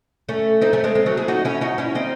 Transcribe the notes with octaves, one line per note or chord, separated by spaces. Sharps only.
A3 C#4
C4 D#4
A3 C#4
G#3 C4
G#3 C4
F#3 A3
E4 G#4
D#4 F#4
C#4 E4
D#4 F#4
C#4 E4
C4 D#4